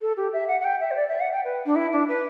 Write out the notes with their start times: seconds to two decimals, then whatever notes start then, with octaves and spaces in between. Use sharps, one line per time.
0.01 A4
0.17 G4
0.33 E5
0.48 F#5
0.60 F#5
0.65 G5
0.80 E5
0.91 C5
0.96 D5
1.09 E5
1.20 F#5
1.32 G5
1.44 B4
1.66 D4
1.75 E4
1.92 D4
2.08 B4